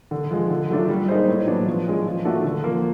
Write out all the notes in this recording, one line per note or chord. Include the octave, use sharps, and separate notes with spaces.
D3
F3 G#3
D3
F#3 A3 D4 F4
G3
A#3 D#4 G#4 C5
A2
F#3 B3 D4
F3
G#3 C#4
F3
A3 D4 F#4 A4
D3
F3 A#3